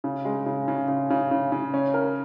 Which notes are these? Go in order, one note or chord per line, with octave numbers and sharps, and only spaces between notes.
C#3
G#3
C#3
C#3
C#3
C#3
C#3
C#3
C#4
A#4